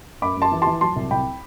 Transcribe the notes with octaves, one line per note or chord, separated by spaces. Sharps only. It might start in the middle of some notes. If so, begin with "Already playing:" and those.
F#2 B5 D6
F#2 A5 C6
E3
E3 A5 C6
F#3 A5 C6
C2
C2 G5 B5